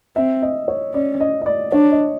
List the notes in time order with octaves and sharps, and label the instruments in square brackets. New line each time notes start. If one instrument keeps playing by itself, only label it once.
[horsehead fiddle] C4 [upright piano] E5
[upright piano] D#5
C#5
[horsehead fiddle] C#4 [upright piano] D5
[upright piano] D#5
D#5
D5
[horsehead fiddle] D4 [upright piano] C#5
[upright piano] D#5